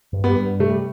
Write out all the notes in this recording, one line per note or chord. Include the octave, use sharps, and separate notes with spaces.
G2
G3 B3
G2
C3 A3
G3